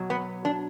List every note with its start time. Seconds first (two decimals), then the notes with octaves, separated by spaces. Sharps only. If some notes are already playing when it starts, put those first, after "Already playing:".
Already playing: B2 F#3
0.10 B3
0.45 D4